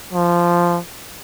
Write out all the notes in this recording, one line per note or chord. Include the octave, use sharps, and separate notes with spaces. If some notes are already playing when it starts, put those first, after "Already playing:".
F3